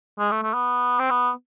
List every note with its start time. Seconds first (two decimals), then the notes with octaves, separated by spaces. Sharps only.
0.19 G#3
0.31 A3
0.42 A3
0.54 B3
0.99 C4
1.10 B3